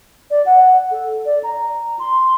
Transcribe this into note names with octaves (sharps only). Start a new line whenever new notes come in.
D5
F#5
A4
D5
A#5
C6